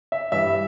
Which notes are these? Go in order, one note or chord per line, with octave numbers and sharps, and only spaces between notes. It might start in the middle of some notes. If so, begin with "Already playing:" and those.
E5
G2 E3 G3 E5